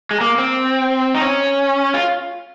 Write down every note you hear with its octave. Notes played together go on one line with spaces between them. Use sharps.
G#3
A#3
C4
D#4
C#4
F4